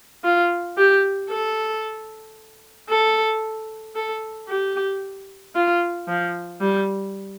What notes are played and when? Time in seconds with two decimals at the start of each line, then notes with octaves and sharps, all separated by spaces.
0.24 F4
0.77 G4
1.30 A4
2.89 A4
3.96 A4
4.48 G4
5.55 F4
6.08 F3
6.61 G3